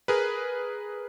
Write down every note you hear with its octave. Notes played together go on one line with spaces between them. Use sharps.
G#4 A#4 B4